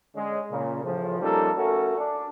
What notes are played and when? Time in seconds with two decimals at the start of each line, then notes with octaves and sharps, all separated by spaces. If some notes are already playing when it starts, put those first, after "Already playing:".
0.15 D3 G#3 C#4
0.51 A#2 C#3
0.84 A2 C#3 E3 F3
1.20 F3 G3 A#3 C#4 D#4 A4
1.56 A3 C#4 F#4 A4 A#4
1.97 D4